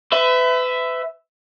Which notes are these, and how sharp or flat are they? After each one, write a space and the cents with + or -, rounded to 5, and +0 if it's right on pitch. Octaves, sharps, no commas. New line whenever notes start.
B4 +35 E5 +0